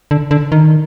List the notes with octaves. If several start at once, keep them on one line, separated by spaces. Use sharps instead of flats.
D3
D3
D#3